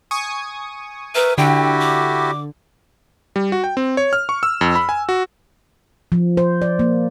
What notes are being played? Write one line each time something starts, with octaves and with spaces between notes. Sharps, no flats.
G#5 C#6 D#6
A#4 B4 E5
D3 E4 F#4 G4 G5
D6
G3
F#4
G5
C4
C#5
F6
C#6
E6
F2
B5
G#5
F#4
F3
C5
D5
A#3